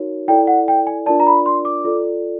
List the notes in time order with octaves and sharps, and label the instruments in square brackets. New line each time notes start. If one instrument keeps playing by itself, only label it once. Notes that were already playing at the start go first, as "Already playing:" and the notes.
Already playing: [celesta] D#4 F#4 A#4 C#5
E4 A4 D5 G5
F#5
G5
G#5
D4 F4 A#4 D5 A5
A#5
B5
C6
D6
F4 A4 D5